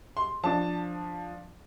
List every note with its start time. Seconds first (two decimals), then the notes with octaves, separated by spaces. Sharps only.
0.17 C6
0.43 F3 D4 A5